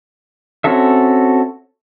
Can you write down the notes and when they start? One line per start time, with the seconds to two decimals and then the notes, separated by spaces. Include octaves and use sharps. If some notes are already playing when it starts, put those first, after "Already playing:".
0.64 C4 C#4 F#4 A4 E5